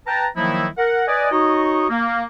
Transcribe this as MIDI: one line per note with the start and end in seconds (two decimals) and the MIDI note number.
0.07 0.26 71
0.07 0.26 79
0.07 0.26 81
0.07 0.26 82
0.37 0.67 51
0.37 0.67 53
0.37 0.67 54
0.37 0.67 58
0.37 0.67 63
0.37 0.67 64
0.78 1.03 70
0.78 1.03 78
1.08 1.29 71
1.08 1.29 74
1.08 1.29 75
1.08 1.29 80
1.32 1.85 63
1.32 1.85 66
1.32 1.85 73
1.32 1.85 75
1.90 2.23 58